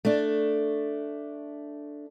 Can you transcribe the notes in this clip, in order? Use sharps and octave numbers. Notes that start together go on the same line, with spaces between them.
A3 D4